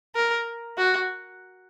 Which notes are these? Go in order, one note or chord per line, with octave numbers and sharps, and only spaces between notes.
A#4
F#4